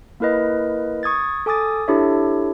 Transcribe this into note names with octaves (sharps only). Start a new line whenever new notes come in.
A#3 E4 A#4 B4 D#5
C#6 D#6 G#6 A6
A4 G#5 D6 D#6 A6
D4 E4 G4 A4 C#5 E5